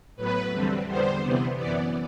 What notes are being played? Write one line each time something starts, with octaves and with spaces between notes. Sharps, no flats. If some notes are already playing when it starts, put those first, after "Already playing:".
A2 F#3 B3 B4
E2 D3 G3 C4
E2 D3 G3 B3 C5
C3 E3 B3
F#2 E3 B3 D5